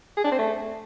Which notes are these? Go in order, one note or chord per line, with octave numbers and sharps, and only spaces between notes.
G#4
D4
C4
A3